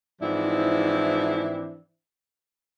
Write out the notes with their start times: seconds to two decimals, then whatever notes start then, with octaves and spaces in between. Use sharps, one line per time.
0.22 G#2 E3 F3 C4 D4 E4